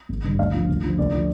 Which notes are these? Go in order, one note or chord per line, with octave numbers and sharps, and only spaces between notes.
G#1
G2 D#3
D2 F5
D3 F3
D2
D3 F3
D2 D5
D3 F3